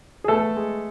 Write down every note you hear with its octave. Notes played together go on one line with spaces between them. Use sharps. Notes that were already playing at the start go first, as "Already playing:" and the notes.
G#4
A3 B3 A4
G#3